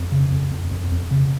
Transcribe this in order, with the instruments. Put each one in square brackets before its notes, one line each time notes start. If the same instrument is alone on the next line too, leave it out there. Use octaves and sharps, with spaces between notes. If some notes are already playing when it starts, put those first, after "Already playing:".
Already playing: [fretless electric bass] F2
C#3
F2
F2
F2
F2
C#3